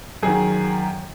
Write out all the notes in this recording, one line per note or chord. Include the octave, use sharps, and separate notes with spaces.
F#2 D#3 G#4